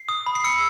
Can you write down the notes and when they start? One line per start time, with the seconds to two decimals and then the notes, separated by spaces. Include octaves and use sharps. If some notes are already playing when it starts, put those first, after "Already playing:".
Already playing: C7
0.09 D#6
0.26 B5
0.35 C7
0.44 E6 C#7